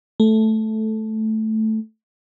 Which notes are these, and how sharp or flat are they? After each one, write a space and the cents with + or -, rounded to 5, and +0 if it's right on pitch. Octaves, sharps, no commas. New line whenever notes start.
A3 -5